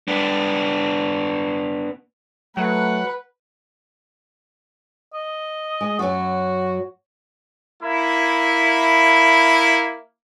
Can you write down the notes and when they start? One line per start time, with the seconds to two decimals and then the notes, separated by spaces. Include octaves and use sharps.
0.08 B3 D4
2.57 F#3 A3 B4 F#5
5.14 D#5
5.81 G#3
5.99 F#2 F#3 F#4
7.83 A#3 E4